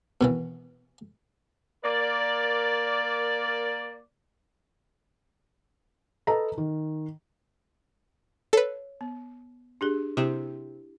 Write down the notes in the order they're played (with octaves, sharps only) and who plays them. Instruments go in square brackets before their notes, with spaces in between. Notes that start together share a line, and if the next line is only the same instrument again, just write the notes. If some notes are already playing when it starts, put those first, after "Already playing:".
[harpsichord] B2 D#3 E3
[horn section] A#3 A#4 D5
[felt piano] A4 B4 D#5 A#5
D#3
[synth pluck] A4 B4 [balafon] C#5
[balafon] B3
D4 G4 G#4
[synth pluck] C3 [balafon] E4 G4